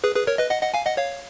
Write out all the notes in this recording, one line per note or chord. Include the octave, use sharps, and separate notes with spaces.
G#4 B4
G#4 B4
A#4 C#5
B4 D#5
D#5 F#5
D#5 F#5
F5 G#5
D#5 F#5
C#5 F5